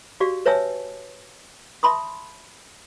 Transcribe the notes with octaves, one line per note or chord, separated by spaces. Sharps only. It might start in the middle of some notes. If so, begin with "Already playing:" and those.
F#4 G4 D5 F5
B4 C#5 E5 G#5 A5 E6
E5 A5 B5 C6 D#6